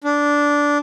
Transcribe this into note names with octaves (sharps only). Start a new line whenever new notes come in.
D4